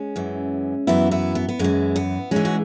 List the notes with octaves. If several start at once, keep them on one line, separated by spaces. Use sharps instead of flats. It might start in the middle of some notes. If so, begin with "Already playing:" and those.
Already playing: G#3 C#4
F#2 E3
F#2 E3 B3 E4
B3 E4
B3
B3
F#2 E3 G#3
B3
G#2 E3 G#3 C#4
F#4